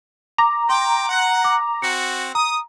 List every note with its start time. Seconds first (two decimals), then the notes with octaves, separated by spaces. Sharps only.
0.38 A#5 D6
0.69 G5 C6 D6
1.09 F#5
1.44 D6
1.82 C4 F#4 C#7
2.35 A#5 D#6